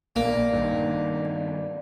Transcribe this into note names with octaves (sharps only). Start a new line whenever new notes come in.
A#1 A#3 D5
G2 D#3